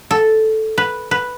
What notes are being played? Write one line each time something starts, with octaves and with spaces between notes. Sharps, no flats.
A4
B4
B4